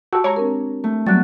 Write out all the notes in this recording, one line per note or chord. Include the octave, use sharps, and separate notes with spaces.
F#4 G4 A5 E6
G#3 G4 C#5 A#5
C4 D4 A#4
A3
F#3 G3 B3 F#6 A6